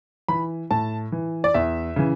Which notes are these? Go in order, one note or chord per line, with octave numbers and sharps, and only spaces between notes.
E3 B5
A2 A5
E3
D5
E2 E5
C#3 E3